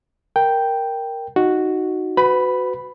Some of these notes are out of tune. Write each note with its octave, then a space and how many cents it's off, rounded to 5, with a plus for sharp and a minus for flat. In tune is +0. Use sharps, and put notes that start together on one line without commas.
A#4 +0 G5 +0
D#4 +0 F#4 +0
F#4 +0 B4 +30 B5 +0